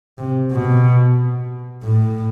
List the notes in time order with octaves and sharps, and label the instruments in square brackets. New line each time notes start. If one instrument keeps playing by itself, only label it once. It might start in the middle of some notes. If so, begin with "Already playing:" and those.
[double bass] C3
B2
A2